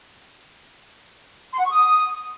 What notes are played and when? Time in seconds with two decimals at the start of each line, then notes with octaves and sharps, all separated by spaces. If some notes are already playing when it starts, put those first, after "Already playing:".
1.54 C6
1.60 F#5
1.66 C#6
1.72 D#6